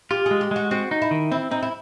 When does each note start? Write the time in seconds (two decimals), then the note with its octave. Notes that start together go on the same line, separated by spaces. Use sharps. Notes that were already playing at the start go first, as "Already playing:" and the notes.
0.11 F4 G4
0.26 G#3 G#4
0.41 G4
0.51 G#3 F#4
0.71 C4 F#4
0.91 D#4
1.02 E4
1.11 D#3
1.32 C4 E4
1.51 C4 D#4
1.62 E4